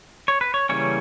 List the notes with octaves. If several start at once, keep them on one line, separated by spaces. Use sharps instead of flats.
C#5
B4
C#5
C#3 E3 G3 A#3 C#4 C#5